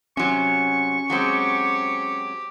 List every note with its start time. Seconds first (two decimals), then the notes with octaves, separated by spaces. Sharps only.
0.17 C3 F#3 C#4 C#6
1.10 F#3 G#3 C4 G4